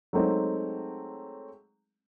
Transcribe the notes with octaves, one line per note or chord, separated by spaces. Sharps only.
F#3 G#3 A3 C4 D#4